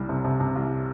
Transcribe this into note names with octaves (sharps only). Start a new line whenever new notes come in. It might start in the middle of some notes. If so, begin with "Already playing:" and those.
Already playing: C2 G3
C3
C3
C3
C2